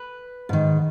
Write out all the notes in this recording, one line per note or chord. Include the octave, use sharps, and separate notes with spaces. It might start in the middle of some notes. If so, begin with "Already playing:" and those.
Already playing: B4
G#2 D#3